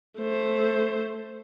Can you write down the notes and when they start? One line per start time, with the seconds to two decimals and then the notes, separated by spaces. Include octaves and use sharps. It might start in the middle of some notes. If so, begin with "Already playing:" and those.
0.18 A3 C5